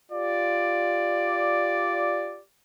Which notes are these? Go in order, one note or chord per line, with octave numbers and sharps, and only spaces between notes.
F4 G4 D5